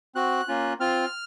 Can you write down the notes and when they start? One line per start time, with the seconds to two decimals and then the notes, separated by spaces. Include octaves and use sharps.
0.15 C4 F#4 F#6
0.48 A#3 C#4 F4
0.80 C4 F4 F6